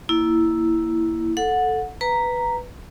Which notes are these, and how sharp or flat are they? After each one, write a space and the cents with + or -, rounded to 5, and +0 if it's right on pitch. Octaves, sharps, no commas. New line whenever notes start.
A#3 +0 E4 +0
A4 +0 F#5 -20
B4 +0 A#5 -5